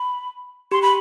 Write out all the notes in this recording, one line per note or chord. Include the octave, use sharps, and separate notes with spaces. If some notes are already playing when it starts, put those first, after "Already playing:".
Already playing: B5
G4 C6
B5